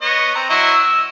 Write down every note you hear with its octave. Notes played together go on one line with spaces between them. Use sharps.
B3 C#5 D#5
C4 A#5
F#3 E4 D#5
E6